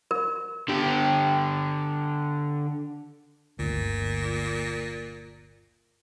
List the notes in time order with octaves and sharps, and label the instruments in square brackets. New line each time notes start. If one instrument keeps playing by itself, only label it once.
[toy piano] A#4
[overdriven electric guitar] D3 G4
[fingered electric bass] G1 D2 [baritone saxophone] A#2